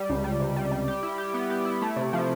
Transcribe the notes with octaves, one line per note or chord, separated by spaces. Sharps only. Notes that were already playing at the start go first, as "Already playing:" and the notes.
Already playing: G3
C#2
G3
C3
G3
G3
G4
E4
G4
B3
G4
E4
A3
C3
F3